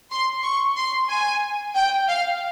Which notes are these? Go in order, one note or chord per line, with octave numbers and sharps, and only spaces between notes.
C6
C#6
C6
G#5
G5
F5